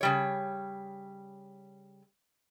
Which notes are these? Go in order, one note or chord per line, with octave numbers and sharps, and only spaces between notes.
C#3 G3 C#5